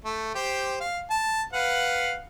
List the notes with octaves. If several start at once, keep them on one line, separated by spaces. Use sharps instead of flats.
A3
G4 C5
F5
A5
B4 F5 F#5